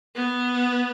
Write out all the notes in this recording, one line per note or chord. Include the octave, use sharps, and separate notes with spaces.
B3